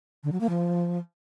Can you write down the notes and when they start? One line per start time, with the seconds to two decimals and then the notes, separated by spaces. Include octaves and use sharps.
0.24 D3
0.32 F#3
0.41 A#3
0.49 F3